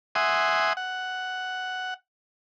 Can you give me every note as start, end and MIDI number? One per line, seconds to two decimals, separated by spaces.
0.15 0.73 76
0.15 0.73 78
0.15 0.73 80
0.15 0.73 84
0.15 0.73 87
0.77 1.94 78